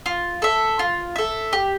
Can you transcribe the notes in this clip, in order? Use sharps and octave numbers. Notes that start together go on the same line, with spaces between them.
F4
A4 E5
F4
A4 E5
G4